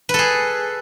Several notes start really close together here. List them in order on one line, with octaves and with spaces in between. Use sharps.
B4 A4 G#4